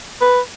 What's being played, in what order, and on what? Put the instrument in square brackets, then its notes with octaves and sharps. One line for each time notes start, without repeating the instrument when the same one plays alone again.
[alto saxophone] B4